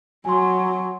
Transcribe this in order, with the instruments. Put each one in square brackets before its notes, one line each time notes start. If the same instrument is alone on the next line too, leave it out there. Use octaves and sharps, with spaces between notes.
[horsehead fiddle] F#3 [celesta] G#5 C6